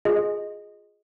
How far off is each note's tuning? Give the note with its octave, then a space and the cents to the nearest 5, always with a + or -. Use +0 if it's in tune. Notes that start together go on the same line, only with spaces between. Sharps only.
F4 +30 G#4 +0 D#5 +0